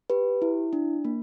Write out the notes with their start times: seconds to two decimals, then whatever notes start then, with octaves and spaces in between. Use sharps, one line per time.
0.10 G4 B4
0.42 E4
0.73 D4
1.05 A#3